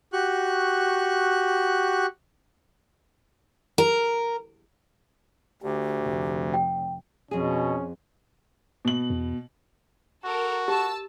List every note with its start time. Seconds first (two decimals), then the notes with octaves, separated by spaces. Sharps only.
0.13 F#4 G4 C#6 F#6
3.78 A#4
5.62 D2 G4
6.02 F1
6.54 G5
7.31 F2 B2 C#4 G#4
8.85 B2 F#7
9.10 E2
10.24 F#4 A4 A#4
10.68 G4 A5 E6